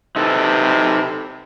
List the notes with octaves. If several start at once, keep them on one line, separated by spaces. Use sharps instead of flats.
C3 D#4 A4 B4